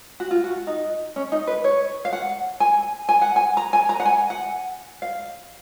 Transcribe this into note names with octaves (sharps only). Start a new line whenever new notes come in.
F#4
F4
F#4
D#4
C#4
D#4
B4
C#5
F5
F#5
G#5
G#5
F#5
G#5
A#5
G#5
A#5
F#5
G#5
F#5
F5